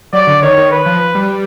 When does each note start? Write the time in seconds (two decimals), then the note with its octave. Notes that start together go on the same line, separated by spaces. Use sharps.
0.13 F#3 D5
0.27 D3
0.42 D#3 C#5
0.57 D#3
0.71 B4
0.86 F3
1.15 G3